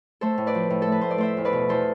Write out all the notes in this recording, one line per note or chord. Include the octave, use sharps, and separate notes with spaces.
A3 A4 C5
A2
B4 D5
F3
A2
A4
A3 B4
A2 C5
D5
A3 C5 E5
E2
B4 D5
B2
E2 A4 C5